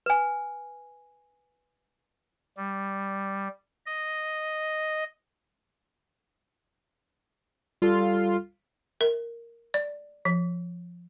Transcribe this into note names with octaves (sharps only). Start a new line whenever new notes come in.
B4 G#5
G3
D#5
G3 F4 A4
A#4
D5
F3